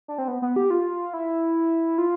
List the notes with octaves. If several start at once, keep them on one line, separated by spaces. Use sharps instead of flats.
D4
C4
B3
B3
G4
F4
E4
F4